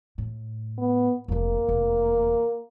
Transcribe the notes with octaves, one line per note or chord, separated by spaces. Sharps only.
A2
B3
F1 F2 A#3
F1 E2